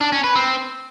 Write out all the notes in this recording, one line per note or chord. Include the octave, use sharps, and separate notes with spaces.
D4
C#4
B4
C4